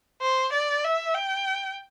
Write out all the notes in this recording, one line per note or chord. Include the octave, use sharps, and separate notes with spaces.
C5
D5
E5
G5